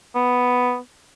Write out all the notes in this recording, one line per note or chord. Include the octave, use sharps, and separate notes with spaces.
B3